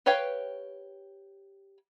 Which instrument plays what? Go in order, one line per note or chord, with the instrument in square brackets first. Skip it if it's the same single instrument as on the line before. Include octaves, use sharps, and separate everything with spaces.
[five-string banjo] G4 B4 C#5 F5 G5